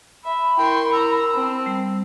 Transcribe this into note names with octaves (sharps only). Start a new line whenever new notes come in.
E5 B5
E4 A#4 G5 C6 C#6
A#5 E6
C4 A5
G3